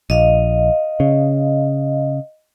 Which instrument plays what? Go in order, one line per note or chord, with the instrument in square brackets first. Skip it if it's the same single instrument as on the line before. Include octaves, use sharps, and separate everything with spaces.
[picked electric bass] A#1 [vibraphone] D#5 F5
[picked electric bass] C#3